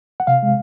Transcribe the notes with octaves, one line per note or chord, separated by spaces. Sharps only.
F#5
C3 F5
G#3